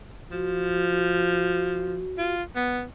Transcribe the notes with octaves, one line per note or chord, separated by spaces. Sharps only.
F3 F#4
F4
B3